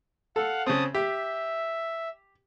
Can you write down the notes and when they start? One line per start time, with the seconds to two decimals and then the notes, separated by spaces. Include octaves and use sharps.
0.36 A4 F5 F#5
0.66 C#3 C4 A5 D#6
0.94 G4 E5